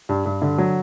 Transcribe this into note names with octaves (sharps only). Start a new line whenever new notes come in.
G2
G2
D3
F#3